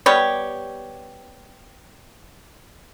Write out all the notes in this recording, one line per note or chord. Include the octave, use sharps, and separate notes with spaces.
G3 B3 G4 C#5